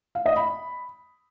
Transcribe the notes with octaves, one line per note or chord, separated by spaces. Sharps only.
F5
D#5
B5